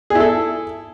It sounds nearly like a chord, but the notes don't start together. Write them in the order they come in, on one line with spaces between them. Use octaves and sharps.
G#4 E4 A4